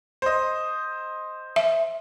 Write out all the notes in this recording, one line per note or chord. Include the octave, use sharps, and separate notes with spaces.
C5 D#5
E5